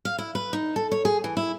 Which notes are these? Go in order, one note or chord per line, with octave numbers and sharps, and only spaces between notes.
F5
E4
B4
D#4
A4
C#5
G#4
E3
E4